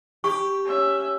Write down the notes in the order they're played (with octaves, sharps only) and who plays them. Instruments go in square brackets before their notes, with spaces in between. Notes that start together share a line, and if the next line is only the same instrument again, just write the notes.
[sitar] G4 [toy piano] C#6
[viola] C#4 E5